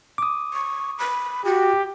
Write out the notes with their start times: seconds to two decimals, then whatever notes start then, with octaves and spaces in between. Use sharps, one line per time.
0.18 D6 D#6
0.53 C#6
0.99 B5
1.45 F#4 G4